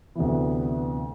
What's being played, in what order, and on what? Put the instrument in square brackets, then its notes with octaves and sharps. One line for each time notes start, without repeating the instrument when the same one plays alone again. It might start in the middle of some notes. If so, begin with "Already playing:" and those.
[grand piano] D2 C3 E3 [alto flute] B3